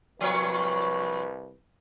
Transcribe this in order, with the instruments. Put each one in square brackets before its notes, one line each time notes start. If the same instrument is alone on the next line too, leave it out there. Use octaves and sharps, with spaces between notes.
[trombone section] C2 B4 [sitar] F3 A#3 C#5